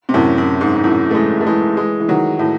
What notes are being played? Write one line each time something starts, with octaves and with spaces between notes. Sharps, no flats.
C3
F#2 A2
F#2
G#2
G#2
F#2 A2
A3
E3 G#3
A3
E3 G#3
E3 G#3
E3
D#3 F#3
A2